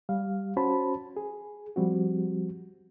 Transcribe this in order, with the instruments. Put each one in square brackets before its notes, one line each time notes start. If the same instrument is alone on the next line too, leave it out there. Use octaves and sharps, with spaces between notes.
[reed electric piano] G3 F5
C#4 F#4 C5 A5 B5
G#4
F3 G3 C4 F#4